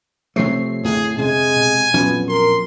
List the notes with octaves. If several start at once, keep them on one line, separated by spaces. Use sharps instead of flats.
C3 F3 A3 C4 C#5 C7
F2 A2 D3 G#4
C3 G#3 G#5
B2
A#1 F2 B2 F3 F#3 B3 C#4
A#4 C6